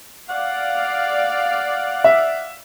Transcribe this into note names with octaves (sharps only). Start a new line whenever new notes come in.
D5 F5 F#5
E5